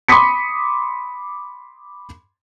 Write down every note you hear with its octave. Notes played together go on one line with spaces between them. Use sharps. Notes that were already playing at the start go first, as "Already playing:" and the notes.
B5 C6 D6 D#6 B6 C#7